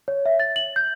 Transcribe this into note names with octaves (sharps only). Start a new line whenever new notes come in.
C#5
E5
A6
F#7
G6